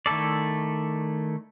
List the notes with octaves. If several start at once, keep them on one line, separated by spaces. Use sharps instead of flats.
D#3 A3 E4 A4 D5